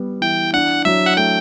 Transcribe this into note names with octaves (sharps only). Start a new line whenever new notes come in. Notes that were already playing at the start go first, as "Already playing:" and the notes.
Already playing: G3 B3
E3 G5
D4 F#5
F#3 E5
F#5
A3 G5